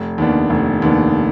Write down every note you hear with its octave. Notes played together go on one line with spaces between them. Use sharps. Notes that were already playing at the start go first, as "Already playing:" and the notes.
Already playing: F1
D#2 D#3 B3 D4
F1
D#2 D#3 B3 D4